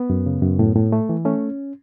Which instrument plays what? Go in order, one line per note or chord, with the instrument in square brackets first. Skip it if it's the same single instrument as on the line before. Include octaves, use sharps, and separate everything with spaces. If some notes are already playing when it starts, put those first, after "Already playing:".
Already playing: [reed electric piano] B3
F#2
C#3
F#2
A2
A2
A3
E3
A3 C#4